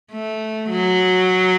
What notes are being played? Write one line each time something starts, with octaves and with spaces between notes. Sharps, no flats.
A3
F#3